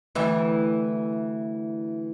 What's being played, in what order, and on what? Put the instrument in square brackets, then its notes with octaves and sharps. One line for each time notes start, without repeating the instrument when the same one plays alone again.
[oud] D2 E3 G3